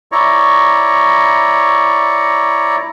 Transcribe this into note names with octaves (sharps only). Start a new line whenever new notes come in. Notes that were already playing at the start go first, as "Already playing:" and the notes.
E4 C#5 D5 A#5 C#6